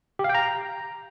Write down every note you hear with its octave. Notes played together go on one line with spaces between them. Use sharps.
G4
F5
G5
A#5